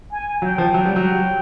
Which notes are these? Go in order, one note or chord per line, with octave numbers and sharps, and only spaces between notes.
G#5
F#3 G5
F3
F#3 G5
G3
F#3